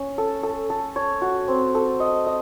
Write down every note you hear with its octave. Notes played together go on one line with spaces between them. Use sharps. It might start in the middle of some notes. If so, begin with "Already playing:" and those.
Already playing: C#4
A4
A4
A4
C#5
F#4
C4
A4
D#5
D#5